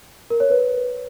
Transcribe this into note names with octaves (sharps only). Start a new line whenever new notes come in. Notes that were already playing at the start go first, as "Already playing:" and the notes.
A#4
C#5
B4